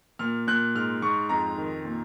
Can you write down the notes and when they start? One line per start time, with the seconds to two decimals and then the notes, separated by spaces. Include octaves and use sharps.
0.19 A#2 F6
0.47 A#2 F#6
0.75 G#2 F6
1.02 G#2 C#6
1.29 F2 A#5
1.57 D#3
1.85 A#2